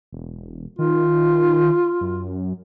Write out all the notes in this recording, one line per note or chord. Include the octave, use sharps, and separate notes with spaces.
E1
D#3 F4
F#2